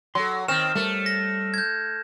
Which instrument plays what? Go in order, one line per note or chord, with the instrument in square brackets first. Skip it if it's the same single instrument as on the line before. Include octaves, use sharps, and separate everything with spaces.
[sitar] F#3 [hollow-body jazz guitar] A4 C6
[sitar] D#3 C4 [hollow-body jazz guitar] C#5 G5 [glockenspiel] F6 E7
[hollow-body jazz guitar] G3 A#4 C#5 [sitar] A3
[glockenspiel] A#6
G6 G#6